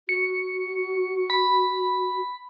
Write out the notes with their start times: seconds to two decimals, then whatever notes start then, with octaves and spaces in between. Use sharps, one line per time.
0.09 F#4 C#7
1.30 B5